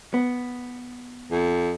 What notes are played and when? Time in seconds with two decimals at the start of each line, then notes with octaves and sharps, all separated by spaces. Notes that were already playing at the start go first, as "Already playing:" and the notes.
0.14 B3
1.31 F2